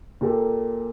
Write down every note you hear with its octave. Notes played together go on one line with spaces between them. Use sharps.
A#2 A#3 G4 A4